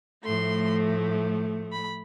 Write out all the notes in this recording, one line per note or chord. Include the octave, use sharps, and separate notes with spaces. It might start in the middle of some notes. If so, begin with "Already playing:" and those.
A2 F3 A3 C6
B5